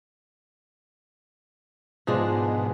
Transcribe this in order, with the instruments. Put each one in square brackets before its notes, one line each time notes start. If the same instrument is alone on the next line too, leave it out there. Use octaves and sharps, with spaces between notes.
[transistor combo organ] G#2 B2 [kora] F3 G#3 D4